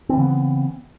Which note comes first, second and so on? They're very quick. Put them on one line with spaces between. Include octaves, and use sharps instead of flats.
C4 E3 C#3 B3